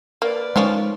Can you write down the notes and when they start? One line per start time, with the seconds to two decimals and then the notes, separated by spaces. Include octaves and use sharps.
0.22 A#3 B4 D5
0.56 D#3 F3 G#3 C#4